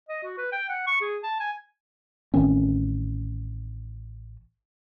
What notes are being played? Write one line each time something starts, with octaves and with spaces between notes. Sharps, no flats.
D#5
F#4
B4
G5
F#5
C#6
G#4
A5
G#5
A1 D#3 C4 C#4